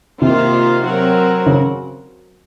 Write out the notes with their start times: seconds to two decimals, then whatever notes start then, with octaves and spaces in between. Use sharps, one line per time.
0.21 C3 D#3 A#3 F4 C5
0.84 F#3 C4 F#4 A#4
1.46 C#3